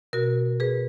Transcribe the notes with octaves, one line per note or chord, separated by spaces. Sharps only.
B2 F#4 A#4
G#4 B4